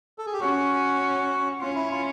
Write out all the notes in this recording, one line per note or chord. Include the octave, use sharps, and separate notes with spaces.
A4
G#4
G4
C#4 F#4
C#4 F4
E4
F4